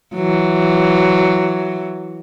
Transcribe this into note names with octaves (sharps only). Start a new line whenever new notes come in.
E3 F#3